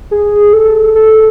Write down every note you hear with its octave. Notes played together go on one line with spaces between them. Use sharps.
G#4
A4
A4